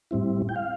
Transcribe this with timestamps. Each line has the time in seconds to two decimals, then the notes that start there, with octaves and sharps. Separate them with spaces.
0.11 A2 G3 C4 E4
0.49 G5
0.56 F5